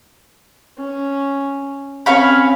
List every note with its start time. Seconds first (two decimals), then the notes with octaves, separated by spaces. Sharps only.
0.78 C#4
2.06 C4 C#4 C#5 F5 B5